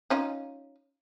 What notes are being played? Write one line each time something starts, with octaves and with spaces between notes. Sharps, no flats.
C#4 D#4 F4